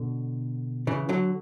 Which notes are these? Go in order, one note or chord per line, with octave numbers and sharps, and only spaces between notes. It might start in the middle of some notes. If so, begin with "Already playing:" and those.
Already playing: B2 D3
C#3 E3
D3 F#3